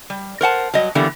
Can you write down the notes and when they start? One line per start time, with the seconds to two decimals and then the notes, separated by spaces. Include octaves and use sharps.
0.10 G3
0.41 A#4 C5 F#5 A5
0.74 F#3 G3 D#5
0.95 D3 E3 G3 A#3 B3